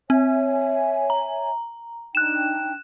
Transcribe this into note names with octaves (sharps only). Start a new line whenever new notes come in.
C4 C#5 E5 G#5
A#5
D4 D#4 G5 F#6 E7